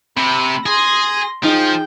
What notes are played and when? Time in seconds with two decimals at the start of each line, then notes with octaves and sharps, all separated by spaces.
0.17 C3 B5 E6
0.66 G#4 C6 A#6
1.44 F3 D#4 G#4 G5